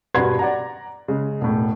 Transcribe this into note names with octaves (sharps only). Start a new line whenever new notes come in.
E1 G2 F#4 B4 C6 G#6
D5 F#5 A#5
C#3 G#3
E1 A2